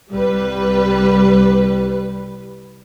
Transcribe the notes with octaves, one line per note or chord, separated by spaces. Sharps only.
C2 G3 B4